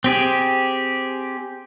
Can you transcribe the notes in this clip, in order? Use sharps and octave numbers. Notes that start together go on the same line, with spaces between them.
C4 G4 G#4